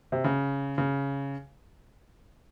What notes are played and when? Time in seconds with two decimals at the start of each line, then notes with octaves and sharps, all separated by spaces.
0.12 C3
0.24 C#3
0.78 C#3